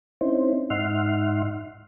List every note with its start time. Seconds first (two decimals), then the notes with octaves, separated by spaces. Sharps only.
0.21 C4 C#4 D#4 E4 C5
0.70 G#2 D#4 E5 F#5 C6 F6